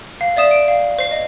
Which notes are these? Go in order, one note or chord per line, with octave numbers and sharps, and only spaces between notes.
F5
D5 E5 D#6 E7
D7
F5
C5 C7
D#5